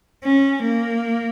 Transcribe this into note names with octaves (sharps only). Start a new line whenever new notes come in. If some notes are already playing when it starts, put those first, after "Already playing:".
C#4
A#3